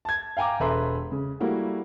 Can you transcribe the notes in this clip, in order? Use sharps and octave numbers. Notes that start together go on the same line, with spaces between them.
A5 G#6
F5 G5 G#5 A#5 D6
E1 A4 B4 E5 A#5 C6
C#3
G3 A3 A#3 E4 F#4